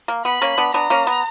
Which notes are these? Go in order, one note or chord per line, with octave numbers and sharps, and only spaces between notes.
A#3
B3 B5
A#3 C#4
B3 D4
B3 D4 A#5
A#3 C#4
B3